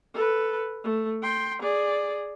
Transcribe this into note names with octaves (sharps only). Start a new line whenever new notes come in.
A4 B4
A3
G5 C6
G#4 D5